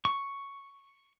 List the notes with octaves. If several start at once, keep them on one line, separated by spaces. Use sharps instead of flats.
C#6